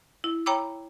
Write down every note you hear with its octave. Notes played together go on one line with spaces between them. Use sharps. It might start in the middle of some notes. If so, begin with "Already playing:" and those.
E4
C#5 G5 A#5 B5 D6 E6